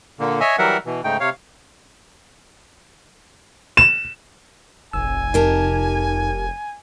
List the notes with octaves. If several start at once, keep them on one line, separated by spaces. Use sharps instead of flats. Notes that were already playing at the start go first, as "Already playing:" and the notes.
A#2 D3 A#3
C#5 D#5 E5 G#5
E3 F#3 G3 A#4 E5 F#5
B2 E3
G#2 C#3 A3 D#4 G5
C3 C#5 F5
E7
F1 A#1 G#5 E6
F2 D#4 G4 A#4 A5